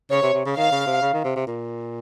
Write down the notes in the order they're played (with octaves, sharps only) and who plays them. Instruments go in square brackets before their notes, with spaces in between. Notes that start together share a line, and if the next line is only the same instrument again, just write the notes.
[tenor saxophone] C#3 [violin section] C#5
[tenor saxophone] C3
C3
C#3
[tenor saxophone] D#3 [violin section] F5
[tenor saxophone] C#3
C3
C#3
D#3
C3
C3
A#2